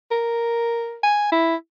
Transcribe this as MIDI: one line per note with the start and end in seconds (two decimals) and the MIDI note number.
0.11 0.98 70
1.03 1.28 80
1.32 1.55 64